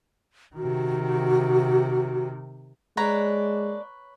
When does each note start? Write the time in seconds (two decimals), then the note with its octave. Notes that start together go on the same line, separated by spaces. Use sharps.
0.56 C3 D#3 F#4
2.97 G#3 A#3 D4 B4 C#5 A#5